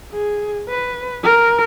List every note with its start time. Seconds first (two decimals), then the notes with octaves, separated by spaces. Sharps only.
0.12 G#4
0.68 B4
1.24 A#4